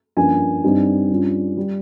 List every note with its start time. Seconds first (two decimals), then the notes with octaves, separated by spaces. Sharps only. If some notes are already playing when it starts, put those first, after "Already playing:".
0.17 G2 F3 A#3 C#4 G#5
0.64 G2 G3 C4 D#4
1.10 G2 G3 C#4 F4
1.57 G3